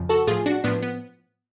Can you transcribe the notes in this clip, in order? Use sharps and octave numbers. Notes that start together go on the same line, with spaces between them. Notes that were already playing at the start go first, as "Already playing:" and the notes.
Already playing: F2 C#3 F3
F#4 A4
A2 F3 F4 G#4
D4 F#4
A2 F3 B3 D4
B3